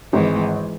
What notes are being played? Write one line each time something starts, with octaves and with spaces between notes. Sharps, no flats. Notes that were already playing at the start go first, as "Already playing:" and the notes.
G#1 E3 G#3